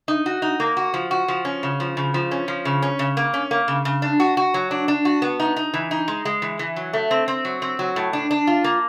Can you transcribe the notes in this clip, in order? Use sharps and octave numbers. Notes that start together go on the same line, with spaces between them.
D#4
F#4
D#4
A#3
F#4
F3
F#4
F3
C#4
C#3
F3
C#3
F3
C#4
F3
C#3
C#4
C#3
A#3
C#4
A#3
C#3
C#3
D4
F#4
F#4
F#3
D4
D4
F#4
B3
D#4
D#4
E3
D#4
G#3
G#3
E3
E3
F#3
A3
C4
C4
F#3
C4
F#3
A2
D4
D4
F4
A#3